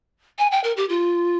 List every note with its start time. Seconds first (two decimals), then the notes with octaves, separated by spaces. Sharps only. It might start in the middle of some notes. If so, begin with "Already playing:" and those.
0.39 G#5
0.52 G5
0.64 A#4
0.77 G4
0.89 F4